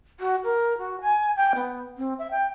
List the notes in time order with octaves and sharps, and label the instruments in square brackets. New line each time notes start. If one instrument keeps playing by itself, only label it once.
[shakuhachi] F#4
A#4
F#4
G#5
G5
B3
C4
E5
G5